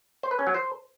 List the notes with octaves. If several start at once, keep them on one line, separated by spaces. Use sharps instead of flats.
C5
B4
C#4
F#3
C5